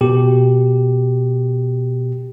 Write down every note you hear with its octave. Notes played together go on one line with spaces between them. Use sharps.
B2 G4